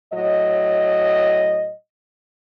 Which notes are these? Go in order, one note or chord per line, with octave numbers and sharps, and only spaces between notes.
A2 F#3 D#5